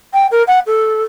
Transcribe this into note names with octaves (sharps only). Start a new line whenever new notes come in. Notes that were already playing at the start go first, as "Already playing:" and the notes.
G5
A#4
F#5
A4